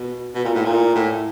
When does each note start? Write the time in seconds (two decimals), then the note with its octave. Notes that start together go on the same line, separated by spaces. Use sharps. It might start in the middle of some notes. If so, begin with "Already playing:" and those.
Already playing: B2
0.34 B2
0.44 A#2
0.54 A2
0.65 A#2
0.95 A2